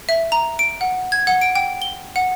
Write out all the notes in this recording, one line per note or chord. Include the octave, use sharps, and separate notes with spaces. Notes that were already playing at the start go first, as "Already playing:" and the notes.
E5
A#5
D7
F#5
G#6
F#5
D7
G5
G7
F#5